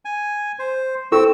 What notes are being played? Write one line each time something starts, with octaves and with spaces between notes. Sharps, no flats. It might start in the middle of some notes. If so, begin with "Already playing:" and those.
G#5
C5
C4 E4 A4 C#6 E6